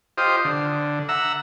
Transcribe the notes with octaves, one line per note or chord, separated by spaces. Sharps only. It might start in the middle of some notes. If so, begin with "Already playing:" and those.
F4 G4 C5 D#5
D3
E5 F#5 A#5 E6